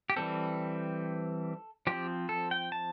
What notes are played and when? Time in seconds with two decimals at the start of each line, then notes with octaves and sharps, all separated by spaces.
0.10 G4
0.16 E3 G3 C4 A4
1.87 F3 C4 G4
2.29 A4
2.51 G5
2.72 A5